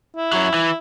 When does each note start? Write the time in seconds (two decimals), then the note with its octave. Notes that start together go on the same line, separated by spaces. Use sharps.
0.16 E4
0.33 F#2 F#3
0.54 E3